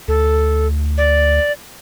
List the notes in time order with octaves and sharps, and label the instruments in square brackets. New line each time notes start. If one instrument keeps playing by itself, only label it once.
[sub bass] D2 [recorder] A4
[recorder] D5